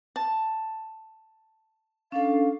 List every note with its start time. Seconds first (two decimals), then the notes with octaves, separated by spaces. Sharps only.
0.16 A5
2.12 C#4 D4 A4 F5